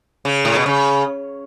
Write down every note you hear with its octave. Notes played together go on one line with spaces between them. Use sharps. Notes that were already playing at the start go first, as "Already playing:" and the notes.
C#3
A2
B2
C#3